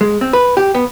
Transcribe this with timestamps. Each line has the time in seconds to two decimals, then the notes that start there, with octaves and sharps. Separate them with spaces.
0.01 G#3
0.21 C4
0.33 B4
0.57 G4
0.75 B3